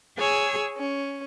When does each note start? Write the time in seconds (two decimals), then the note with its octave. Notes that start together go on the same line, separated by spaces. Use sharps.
0.18 G#4 C#5 G#5 E6
0.77 C#4